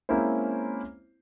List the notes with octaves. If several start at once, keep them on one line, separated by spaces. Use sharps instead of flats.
G#3 A#3 C4 C#4 E4 C5